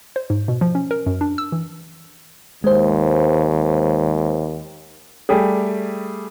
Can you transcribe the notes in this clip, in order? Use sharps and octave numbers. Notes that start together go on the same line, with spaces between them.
C5
G#2
B2
F3
C#4
A#4
F#2
D4
E6
E3
D#2 G#3 C5
G3 A3 G4 G#4